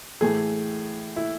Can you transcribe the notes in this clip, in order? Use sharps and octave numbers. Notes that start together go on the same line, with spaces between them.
A2 E3 A3 G#4
E4